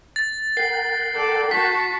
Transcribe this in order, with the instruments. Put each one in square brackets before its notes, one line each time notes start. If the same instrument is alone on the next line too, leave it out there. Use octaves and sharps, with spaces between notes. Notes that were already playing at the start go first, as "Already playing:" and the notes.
[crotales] A6
[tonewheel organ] A#4 F#5 G5 [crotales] C7
[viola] A4 D5
[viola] F#4 A5 [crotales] B6